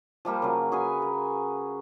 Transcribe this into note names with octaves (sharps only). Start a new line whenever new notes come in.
F3 G3 A#3 G4
C#3 F#3
F#4 G#4 B4 G#5
A#4